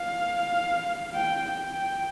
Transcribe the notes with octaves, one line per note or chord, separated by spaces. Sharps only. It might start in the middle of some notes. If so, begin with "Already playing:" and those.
Already playing: F5
G5
G5